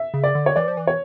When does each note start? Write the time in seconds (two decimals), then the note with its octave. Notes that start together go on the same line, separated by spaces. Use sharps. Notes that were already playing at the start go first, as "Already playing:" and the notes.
Already playing: E5
0.14 C#3
0.24 D5
0.35 D3
0.46 C#5
0.56 E3 D5
0.68 F3
0.77 E3
0.87 C#5